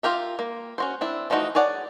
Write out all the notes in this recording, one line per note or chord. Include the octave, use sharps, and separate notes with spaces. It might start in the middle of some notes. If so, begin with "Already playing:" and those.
F4 G4 A#4 E5
A#3
C#4 F#4 C5
C4 D4 E4
E3 F3 A3 D#4 F#4
G#4 C#5 D5 F#5 A5